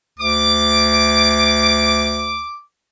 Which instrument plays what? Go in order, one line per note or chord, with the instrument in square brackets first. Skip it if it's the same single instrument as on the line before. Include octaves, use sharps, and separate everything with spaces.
[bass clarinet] D2 [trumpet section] D6